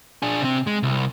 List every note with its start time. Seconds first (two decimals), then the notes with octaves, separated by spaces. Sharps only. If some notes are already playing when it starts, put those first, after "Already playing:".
0.22 D4 G#4
0.41 C3 C4
0.67 G#3
0.83 C2